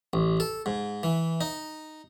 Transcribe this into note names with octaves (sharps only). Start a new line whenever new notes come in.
A1
A4
G#2
E3
D#4